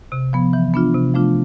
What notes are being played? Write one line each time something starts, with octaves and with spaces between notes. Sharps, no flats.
C3
F3 B3
E3
B3 D4 F4
C3
F3 A3 D4 F4